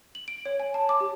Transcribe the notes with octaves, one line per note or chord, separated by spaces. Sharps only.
F#7
D7
C#5
G#5
A5
D6
G4